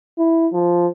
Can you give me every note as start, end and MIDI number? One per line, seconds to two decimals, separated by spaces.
0.18 0.47 64
0.53 0.87 53